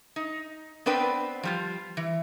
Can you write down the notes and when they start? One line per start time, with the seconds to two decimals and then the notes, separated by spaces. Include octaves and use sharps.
0.16 D#4
0.86 B3 C4 D4 B4 G5
1.43 F3 G3 F4
1.97 E3